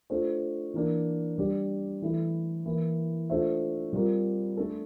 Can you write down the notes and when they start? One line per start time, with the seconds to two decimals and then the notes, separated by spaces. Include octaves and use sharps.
0.10 A3 D4 F4 C5
0.74 E3 A#3 D4
1.38 G3 D4 G4 D5
2.02 E3 A3 E4 A4
2.65 E3 A#3 E4
3.30 A3 D4 F4 C5 E5
3.93 G3 C4 F4 A#4
4.57 A3 D4 A4